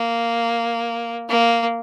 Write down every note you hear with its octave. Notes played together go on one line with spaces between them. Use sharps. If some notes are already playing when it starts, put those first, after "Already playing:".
Already playing: A#3
A#3